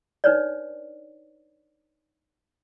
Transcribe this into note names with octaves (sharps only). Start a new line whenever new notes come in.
D4 D#4 B4 C#5 D5